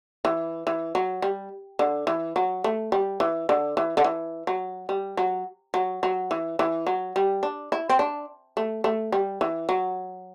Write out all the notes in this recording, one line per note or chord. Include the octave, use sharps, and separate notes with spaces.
E3
E3
F#3
G3
D3
E3
F#3
A3
G3
E3
D3
E3
D3
E3
F#3
G3
F#3
F#3
F#3
E3
E3
F#3
G3
D4
E4
C4
D4
A3
A3
G3
E3
F#3